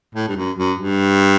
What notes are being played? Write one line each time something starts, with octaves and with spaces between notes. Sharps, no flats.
A2
G2
F#2
F#2
G2